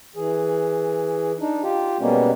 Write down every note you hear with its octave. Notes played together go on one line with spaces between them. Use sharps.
E3 G#4
D4 D#4
F4 G4
B2 G3 G#3 A#3 B3 C#4